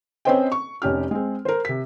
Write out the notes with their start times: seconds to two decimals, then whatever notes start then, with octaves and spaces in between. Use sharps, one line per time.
0.25 C4 C#4 B4 C5 D#5 G5
0.52 C#6
0.82 F1 C#4 G4 F6
1.11 G#3 C4
1.45 A#4 C5
1.65 C3 B6